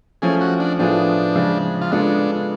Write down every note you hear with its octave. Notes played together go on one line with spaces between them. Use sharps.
F3 A3 C#4 G#4
F#4
D4
A2 F3 B3 D4 F4 G#4
C#3 F3 G#3
F4
C#3 G#3 B3 D4 F4 A4